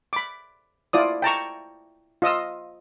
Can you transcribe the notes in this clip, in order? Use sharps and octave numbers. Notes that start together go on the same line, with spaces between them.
B5 D6
E4 F4 D5 D#6
G5 A5 A#5 C#6
F4 D#5 D#6 E6